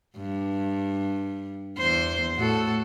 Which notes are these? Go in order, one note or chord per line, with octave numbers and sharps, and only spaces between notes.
G2
E2 C5
A2 F#4 A4